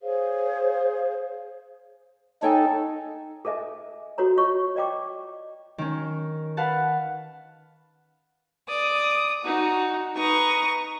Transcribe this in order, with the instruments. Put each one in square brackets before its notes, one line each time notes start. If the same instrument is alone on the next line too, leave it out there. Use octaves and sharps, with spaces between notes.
[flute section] G#4 C5 C#5 F5
[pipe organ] D#4 A4 [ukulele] C#5 G5 G#5
[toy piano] G#4 A4 D#5 E5 G#5
F#4 A4 C#5 A#5
F4 C#5 D#5 C#6
D5 D#5 G5 D6
[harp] D#3 C#4
B4 F5 F#5 A5
[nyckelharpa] D5 [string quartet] D#6
[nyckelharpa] D#4 [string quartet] F#4
[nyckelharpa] D#4 B4 [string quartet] A#5 C#6 D#6